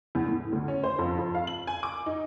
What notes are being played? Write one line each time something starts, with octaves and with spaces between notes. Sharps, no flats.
E2
A2
D2
C#4
C5
F2
F2
F5
F#7
G#5
D6
D#4